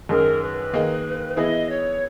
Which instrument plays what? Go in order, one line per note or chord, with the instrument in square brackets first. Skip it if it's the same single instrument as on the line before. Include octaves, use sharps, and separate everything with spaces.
[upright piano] F#2 D#3 G#3 C#4 G#4 [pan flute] A#4
[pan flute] B4
[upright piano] D#3 A#3 D#4 G#4 D#5
[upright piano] E3 B3 E4 G#4 [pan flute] D#5
[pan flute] C#5